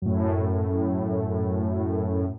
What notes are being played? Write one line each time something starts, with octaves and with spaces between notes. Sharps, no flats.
F#2 A2